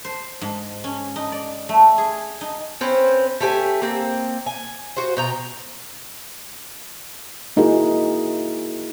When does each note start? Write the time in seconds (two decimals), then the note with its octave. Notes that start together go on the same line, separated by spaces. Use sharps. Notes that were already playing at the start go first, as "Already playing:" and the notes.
0.05 C5
0.41 G#2
0.84 C#4
1.16 D#4
1.32 D5
1.69 A3
1.98 G#4
2.41 D#4
2.81 C4 C#4 B4 C5
3.41 A3 G4 G#5
3.82 A#3 C4
4.46 G#5
4.97 F#4 C5
5.17 B2 G5 A#5
7.57 A#3 D#4 E4 F#4 G#4 A#4